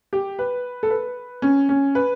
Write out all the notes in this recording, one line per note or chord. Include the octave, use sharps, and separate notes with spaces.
G4
B4
A4
B4
C#4
C#4
B4